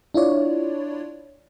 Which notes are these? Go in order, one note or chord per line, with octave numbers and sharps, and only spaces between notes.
D4 E4 F4 C#5 D5